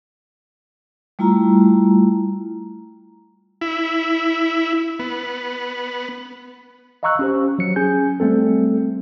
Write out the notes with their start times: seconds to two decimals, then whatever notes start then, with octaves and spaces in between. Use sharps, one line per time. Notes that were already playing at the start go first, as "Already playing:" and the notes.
1.19 G3 A3 E4 F4 A#5
3.61 E4
5.00 B3
7.03 D#5 F5 A#5 C#6 E6 F#6
7.19 C#4 G4 C5
7.59 F#3 C#7
7.76 C#4 G#4 G#5 G6
8.20 G3 A3 C4 A4